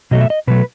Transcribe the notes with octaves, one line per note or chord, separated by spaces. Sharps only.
B2 F#3 A3 D#5
E5
D#5
B2 F#3 A3 B4